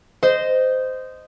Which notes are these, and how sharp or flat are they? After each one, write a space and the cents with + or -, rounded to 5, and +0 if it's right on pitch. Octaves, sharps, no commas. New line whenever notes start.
C5 -15 D#5 -5